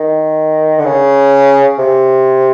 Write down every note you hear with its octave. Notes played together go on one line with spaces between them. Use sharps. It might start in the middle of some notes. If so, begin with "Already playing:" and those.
Already playing: D#3
D3
C#3
C3